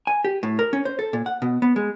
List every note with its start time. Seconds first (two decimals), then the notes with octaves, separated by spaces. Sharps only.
0.07 G#5
0.25 G4
0.43 A2
0.59 A#4
0.73 C#4
0.85 C5
0.99 A4
1.13 A#2
1.26 F#5
1.42 B2
1.62 B3
1.76 G#3